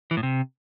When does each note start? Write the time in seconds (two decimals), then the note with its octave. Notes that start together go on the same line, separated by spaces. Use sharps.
0.11 E3
0.17 A2
0.23 C3